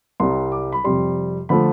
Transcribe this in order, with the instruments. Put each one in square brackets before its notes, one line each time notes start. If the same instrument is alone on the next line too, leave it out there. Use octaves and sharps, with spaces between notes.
[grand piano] C2 C3 G3 C6
D6
B5
F2 C3 G3 C6
D3 F3 A3 B5